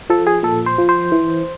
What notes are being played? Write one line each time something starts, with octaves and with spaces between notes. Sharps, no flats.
F3 A4
G#4
A#2 A4
C5
F3
C5
E3